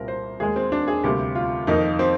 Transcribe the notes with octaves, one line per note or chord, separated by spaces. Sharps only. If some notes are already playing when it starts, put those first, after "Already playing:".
Already playing: C2 A#2 G3 C4 A#4
C5
D#2 D#3 G#3 G#4
C4
D4
G#4
D2 C3 G3 A#3 G4
F4
F2 D#3 A#3 D#4
C4